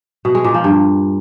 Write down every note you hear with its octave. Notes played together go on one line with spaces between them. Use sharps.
B2
G#3
A#2
F3
G2